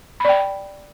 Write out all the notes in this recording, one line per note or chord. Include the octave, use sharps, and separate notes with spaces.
D5 G5 B5